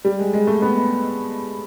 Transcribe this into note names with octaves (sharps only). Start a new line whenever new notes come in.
G3
G#3
G#3
A3
B3